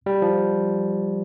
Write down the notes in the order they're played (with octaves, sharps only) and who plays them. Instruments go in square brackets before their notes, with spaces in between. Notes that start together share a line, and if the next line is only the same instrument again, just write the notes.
[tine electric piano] G3
F3